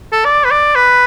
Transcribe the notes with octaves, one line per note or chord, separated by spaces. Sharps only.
A4
D5
B4
D5
B4